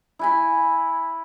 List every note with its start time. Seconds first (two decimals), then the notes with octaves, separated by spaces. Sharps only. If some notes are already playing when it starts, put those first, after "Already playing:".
0.19 E4 G#5 B5